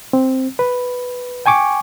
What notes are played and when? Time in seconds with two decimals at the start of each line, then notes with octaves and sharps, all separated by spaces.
0.13 C4
0.59 B4
1.46 G5 G#5 C#6 D6